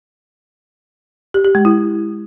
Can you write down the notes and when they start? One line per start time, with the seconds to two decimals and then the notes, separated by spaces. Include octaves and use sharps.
1.34 G4
1.45 G4
1.55 G#3
1.65 E4